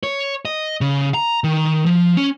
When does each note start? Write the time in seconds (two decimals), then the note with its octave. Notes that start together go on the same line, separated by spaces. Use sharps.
0.03 C#5
0.45 D#5
0.81 C#3
1.14 A#5
1.44 D#3
1.86 F3
2.17 C#4